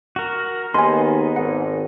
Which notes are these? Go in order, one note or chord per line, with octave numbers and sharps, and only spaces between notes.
F#4 A#4
D#2 B3 D#4 G#4 G#5 C6
G#1 F#5